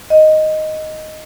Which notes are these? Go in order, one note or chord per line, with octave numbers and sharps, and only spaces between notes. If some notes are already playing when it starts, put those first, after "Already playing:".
D#5